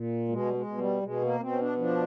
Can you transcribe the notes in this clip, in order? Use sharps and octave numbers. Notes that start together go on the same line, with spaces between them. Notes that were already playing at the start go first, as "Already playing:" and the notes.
Already playing: A#2
B2 G#3
G3
G#3
B2
G3
B2 G#3
A#3
B2 C4
C#4
D4
F3 D4